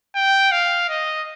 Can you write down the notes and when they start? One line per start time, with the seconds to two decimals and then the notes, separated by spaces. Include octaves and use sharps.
0.15 G5
0.52 F5
0.89 D#5